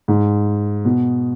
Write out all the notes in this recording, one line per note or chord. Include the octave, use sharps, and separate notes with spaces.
G#2
B2